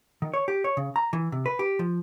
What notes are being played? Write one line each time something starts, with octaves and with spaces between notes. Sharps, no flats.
D#3
C#5
G4
C#5
C#3
A#5
E3
C3
B4
G4
F3